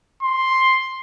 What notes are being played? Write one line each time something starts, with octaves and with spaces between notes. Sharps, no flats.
C6